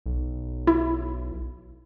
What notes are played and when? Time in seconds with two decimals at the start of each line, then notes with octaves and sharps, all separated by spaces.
0.06 B1
0.67 E4